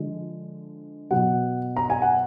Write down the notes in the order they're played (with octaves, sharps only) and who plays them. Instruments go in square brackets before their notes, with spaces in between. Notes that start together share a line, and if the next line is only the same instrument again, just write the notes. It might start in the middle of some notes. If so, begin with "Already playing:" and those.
Already playing: [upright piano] D3 F3 G#3
B2 F#3 F#5
A#5
G#5
F#5